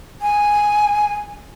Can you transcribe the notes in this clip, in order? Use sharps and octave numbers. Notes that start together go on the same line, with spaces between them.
G#5